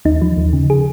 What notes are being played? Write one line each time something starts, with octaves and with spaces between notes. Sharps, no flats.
D#2 D#4
F3
D#2
C#3
G#4